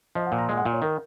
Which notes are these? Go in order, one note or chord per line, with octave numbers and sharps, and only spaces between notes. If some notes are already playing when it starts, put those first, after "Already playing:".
F3 D#5
F#5
A#2
A#5
G#3 G#5
F#5
A#2 F5
C#5
D#3 A#4